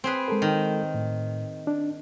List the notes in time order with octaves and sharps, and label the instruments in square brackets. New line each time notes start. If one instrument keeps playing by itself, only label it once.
[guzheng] C4 G#4 B4
[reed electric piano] G#3 A4 A#4
[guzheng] D#3
[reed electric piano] A2
D4